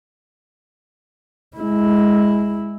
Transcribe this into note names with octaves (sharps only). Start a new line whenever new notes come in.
G#3 E4